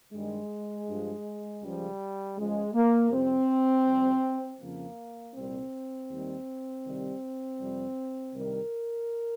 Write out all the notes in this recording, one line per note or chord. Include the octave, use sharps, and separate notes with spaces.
G2 D#3 G3 G#3
G2 F3
C#2 C#3 F3 G3
C#2 C#3 F3 G#3
A#3
F2 C3 G3 C4
F2 C3 G3
F2 C#3 F3 A#3
C2 A#2 G3 C4
D#2 D#3 G3
C2 C3 D#3 G3
F2 C3 G3
C2 C3 D#3 G3 A#4